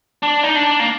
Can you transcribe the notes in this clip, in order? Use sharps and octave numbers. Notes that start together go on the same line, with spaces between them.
D4
D#4
D4
A#3